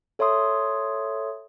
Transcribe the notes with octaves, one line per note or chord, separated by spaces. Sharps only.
A4 C#5 E5 C6 D#6